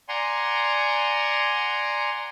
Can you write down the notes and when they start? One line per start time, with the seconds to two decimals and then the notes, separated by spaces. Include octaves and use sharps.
0.09 D5 F#5 G#5 A#5 C6